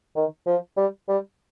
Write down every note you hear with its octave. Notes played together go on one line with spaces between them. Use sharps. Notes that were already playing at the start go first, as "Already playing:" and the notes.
D#3
F3
G3
G3